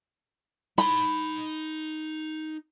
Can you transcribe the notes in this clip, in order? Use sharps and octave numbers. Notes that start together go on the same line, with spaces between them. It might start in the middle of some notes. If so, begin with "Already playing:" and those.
D#4 B5 C6